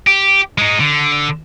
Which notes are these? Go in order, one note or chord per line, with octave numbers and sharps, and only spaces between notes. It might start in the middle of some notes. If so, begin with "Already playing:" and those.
G4
G#3 D#4
D3